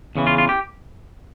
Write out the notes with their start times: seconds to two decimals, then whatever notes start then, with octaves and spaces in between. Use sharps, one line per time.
0.15 E2 C#3 E3
0.27 F4
0.38 F4
0.49 G4